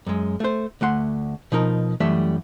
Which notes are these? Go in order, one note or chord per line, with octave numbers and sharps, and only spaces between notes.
F#2 G#3
A3 C5
D2 A3 F#5 C6
B2 F3 D#4 A#4
F#2 E3 G3 A3 E5